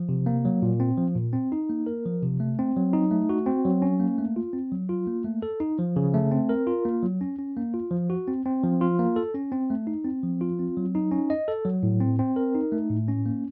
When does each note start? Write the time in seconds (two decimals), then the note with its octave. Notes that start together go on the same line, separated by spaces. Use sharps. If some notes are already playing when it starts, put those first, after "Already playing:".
Already playing: F3
0.09 C3
0.26 A#3
0.45 F#3
0.62 A#2
0.80 C4
0.98 F3
1.15 A#2
1.33 C4
1.52 D#4
1.70 A#3
1.86 A#4
2.05 F3
2.23 C3
2.40 A3
2.59 C4
2.76 F#3
2.93 D#4
3.11 A3
3.29 F#4
3.46 C4
3.65 F#3
3.82 C#4
4.00 A#3
4.18 A3
4.36 F4
4.53 C4
4.72 F#3
4.89 F4
5.07 A#3
5.24 A3
5.42 A4
5.60 D#4
5.79 F3
5.96 C#3
6.14 A3
6.31 C4
6.49 A#4
6.67 F4
6.85 A#3
7.03 F#3
7.21 C#4
7.39 C#4
7.57 A#3
7.74 F4
7.91 F3
8.10 F#4
8.28 C4
8.46 C4
8.63 F3
8.81 F4
8.99 A#3
9.16 A4
9.34 C#4
9.52 C4
9.70 A3
9.87 D#4
10.05 C4
10.23 F3
10.41 F4
10.59 C4
10.77 F#3
10.95 D#4
11.11 C#4
11.30 D#5
11.48 A4
11.65 F#3
11.83 A2
12.01 C4
12.19 C4
12.36 A#4
12.55 D#4
12.72 A3
12.90 A2
13.08 C#4
13.26 A#3